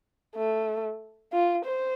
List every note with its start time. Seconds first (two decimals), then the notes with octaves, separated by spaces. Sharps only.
0.35 A3
1.33 F4
1.64 C5